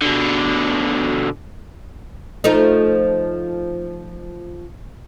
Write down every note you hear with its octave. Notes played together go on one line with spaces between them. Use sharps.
B2 D3
F3 A3 D#4